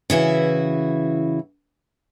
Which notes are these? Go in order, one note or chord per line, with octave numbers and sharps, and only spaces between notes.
C#3 E3 E4 F#4